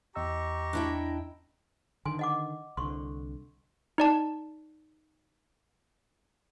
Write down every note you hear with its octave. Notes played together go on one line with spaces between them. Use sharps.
E2 G4 D#5 A#5 C#6 E6
D4 E4 G5
D3 D#3 G#5 C6
D#5 F#5 D6
C2 D3 C6 C#6
D#4 D5 A5